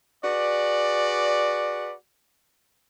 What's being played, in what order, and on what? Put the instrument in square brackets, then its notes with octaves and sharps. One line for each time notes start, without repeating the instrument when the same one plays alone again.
[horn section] F#4 G#4 B4 D5